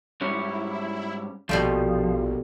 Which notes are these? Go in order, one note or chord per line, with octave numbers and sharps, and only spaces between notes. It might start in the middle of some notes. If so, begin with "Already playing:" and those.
G#2 G3 C#4 E4
A#1 B2 F3 G3 A3